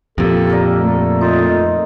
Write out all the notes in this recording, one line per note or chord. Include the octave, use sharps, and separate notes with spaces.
F2 A#2 G4 A4
A#4 D5
A3 A4
D#4 F4